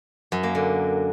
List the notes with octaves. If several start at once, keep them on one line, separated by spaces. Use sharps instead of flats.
F#2
A#3
D3